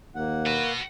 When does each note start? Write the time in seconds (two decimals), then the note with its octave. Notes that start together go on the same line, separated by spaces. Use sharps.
0.15 D#2 A#3 F#5
0.47 F#4 B4